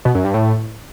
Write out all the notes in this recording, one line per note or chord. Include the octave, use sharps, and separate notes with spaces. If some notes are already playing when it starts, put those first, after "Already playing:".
B2
F#2
G2
A2